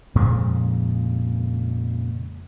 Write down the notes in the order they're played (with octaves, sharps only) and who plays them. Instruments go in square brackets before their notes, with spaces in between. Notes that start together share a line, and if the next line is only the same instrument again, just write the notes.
[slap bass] F2 A#2 C#3 G#3